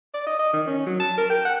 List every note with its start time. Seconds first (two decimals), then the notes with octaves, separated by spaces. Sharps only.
0.14 D5
0.27 D#5
0.39 D#5
0.53 D#3
0.67 C#4
0.86 F#3
1.00 A5
1.18 A#4
1.30 G5
1.45 F#5